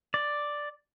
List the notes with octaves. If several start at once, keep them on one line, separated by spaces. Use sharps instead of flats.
D5